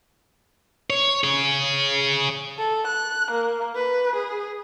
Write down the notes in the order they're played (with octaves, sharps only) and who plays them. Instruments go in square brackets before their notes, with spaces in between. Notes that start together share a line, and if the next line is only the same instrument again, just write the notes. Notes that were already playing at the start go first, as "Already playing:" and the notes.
[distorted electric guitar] C#5
G#4 C#5
[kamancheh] A4
F#6
A#3
B4
G#4